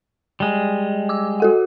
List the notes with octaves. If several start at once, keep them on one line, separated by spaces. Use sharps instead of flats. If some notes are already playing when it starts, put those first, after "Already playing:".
G3 G#3
D6 E6
F#4 A4 F#5